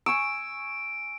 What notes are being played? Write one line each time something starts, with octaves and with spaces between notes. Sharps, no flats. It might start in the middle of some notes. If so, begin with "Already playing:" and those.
G#5 C#6 E6 D7